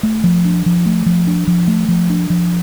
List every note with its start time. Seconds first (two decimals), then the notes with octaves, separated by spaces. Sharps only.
0.03 A3
0.24 F3
0.45 D4
0.66 F3
0.86 A3
1.06 F3
1.27 D4
1.47 F3
1.68 A3
1.88 F3
2.10 D4
2.30 F3